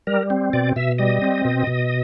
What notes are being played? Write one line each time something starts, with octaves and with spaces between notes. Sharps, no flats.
G3 A#4
C4
B2 D5
B2 E5
G3 D#5
C4
B2
B2